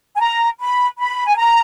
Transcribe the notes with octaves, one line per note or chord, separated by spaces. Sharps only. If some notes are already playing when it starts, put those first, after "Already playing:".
G#5
A#5
B5
B5
G#5
A#5